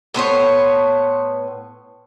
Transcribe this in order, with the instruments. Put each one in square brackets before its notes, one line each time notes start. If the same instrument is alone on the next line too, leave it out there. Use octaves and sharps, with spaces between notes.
[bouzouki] A2 B3 C5 C#5